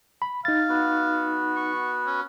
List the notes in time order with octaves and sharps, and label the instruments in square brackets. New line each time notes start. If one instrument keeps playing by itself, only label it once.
[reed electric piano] B5
[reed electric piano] D#4 A6 [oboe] F5
[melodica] B3 F#4
[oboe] C#6
C#4